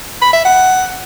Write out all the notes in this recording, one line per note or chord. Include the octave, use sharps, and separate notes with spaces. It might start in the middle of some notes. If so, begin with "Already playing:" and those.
B5
E5
F#5